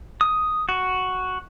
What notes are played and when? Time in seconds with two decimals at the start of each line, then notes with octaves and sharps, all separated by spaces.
0.21 D#6
0.69 F#4